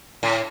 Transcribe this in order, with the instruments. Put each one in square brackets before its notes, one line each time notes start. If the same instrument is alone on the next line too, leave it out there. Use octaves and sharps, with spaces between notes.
[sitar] A2